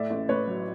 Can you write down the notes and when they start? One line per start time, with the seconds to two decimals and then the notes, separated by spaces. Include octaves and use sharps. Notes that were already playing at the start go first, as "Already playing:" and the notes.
Already playing: A2 D5 E5
0.10 A1
0.29 A1 B4 C#5
0.47 F#3